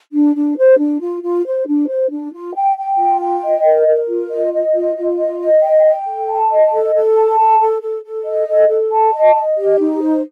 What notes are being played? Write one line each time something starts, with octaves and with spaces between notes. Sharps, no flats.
D4
D4
C5
D4
F4
F4
C5
D4
C5
D4
F4
G5
G5
F4
G5
D#5
A#4
A#4
F4
D#5
D#5
F4
F4
D#5
D#5
G5
G5
A4
A5
D#5
A4
A4
A5
A4
A4
A4
A4
D#5
A4
A4
A5
D#5
D#5
G4
D#4
C5